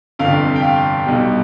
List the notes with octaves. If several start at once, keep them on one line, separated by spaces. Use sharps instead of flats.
G1 F2 C3 F5
G5
F5
B1 B2 G3